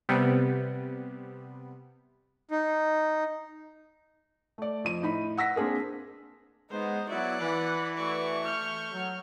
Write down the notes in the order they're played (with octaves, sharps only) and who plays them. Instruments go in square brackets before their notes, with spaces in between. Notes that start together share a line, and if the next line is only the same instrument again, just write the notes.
[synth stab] C3 G3 B3
[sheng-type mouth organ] D#4
[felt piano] A3 D5
F2 D#7
A2 D#4 B5
F#5 E6 A#6 B6
A#3 C4 D4 G#4 A#4
[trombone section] G#3 B3 [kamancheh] D#4 [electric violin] C5
[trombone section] F#3 B3 E4 [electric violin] F#4 [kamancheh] D5 F#6
[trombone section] E3 [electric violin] B4 F#5
[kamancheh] A3 C#6 [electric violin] F#4 D5
[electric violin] F6 G6
[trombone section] F#3